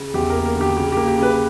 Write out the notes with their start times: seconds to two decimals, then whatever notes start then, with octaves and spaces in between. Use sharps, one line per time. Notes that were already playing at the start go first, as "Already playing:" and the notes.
Already playing: C#3
0.14 E2 G4
0.30 A#4
0.35 A#3
0.45 A#4
0.56 D3
0.61 G4
0.76 C#3 G4
0.92 A#3 G4
1.08 G4
1.18 C#3 B4